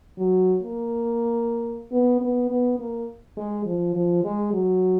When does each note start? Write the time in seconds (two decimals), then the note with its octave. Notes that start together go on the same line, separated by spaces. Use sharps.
0.18 F#3
0.63 A#3
1.92 B3
2.21 B3
2.50 B3
2.79 A#3
3.37 G#3
3.66 F3
3.95 F3
4.24 G#3
4.53 F#3